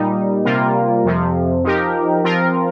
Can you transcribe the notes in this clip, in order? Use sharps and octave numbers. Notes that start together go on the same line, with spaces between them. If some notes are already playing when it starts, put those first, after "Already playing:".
Already playing: A#2 G3 D#4
C3 G3 A#3 F4 A#4
F2 C3 F3
F3 D#4 G4 A#4
F3 C4 F4 A#4